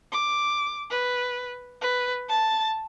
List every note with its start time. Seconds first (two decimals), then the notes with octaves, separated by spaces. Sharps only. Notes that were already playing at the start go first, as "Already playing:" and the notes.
0.12 D6
0.90 B4
1.81 B4
2.29 A5 A6